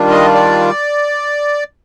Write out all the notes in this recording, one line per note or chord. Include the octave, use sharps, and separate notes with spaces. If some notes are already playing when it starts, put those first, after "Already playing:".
Already playing: D#3 G3 D4 F4
D#5
D5